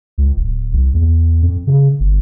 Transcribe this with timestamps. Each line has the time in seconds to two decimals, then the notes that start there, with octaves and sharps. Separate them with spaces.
0.18 C#2
0.36 D1
0.72 C2
0.93 E2
1.42 F2
1.67 C#3
2.00 G1